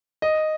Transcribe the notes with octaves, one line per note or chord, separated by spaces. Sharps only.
D#5